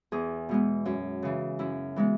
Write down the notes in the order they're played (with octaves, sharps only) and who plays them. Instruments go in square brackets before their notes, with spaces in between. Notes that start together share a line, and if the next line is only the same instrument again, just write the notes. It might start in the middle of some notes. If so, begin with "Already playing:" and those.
[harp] E2 G#4
B2 G#3 B3
F#2
C#3 E3
F#2 E4
E3 G#3 B3